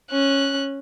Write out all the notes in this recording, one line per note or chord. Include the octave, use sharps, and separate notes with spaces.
C#4 F#6